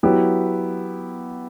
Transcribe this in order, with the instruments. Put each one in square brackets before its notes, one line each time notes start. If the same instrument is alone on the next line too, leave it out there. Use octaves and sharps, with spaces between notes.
[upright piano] F#3 B3 E4 G4